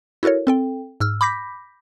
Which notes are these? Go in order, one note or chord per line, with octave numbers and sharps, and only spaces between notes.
E4 F#4 A4 A#4 C#5
C4 A4 G5
G#2 E6 F6
B5 D6 G6 A#6 B6